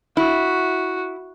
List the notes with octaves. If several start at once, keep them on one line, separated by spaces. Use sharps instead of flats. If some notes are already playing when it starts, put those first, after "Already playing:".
E4 F#4